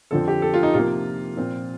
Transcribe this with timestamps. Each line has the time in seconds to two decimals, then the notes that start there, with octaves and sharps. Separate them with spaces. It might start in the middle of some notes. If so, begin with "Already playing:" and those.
0.11 F2 D3 F3 C4 A4
0.28 G4
0.42 A4
0.54 F4
0.63 D#4
0.74 C3 F3 A#3 F4
1.37 A#2 F3 C4